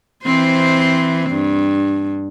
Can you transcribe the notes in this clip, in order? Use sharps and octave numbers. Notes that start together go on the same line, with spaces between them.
E3 C4 C5
G2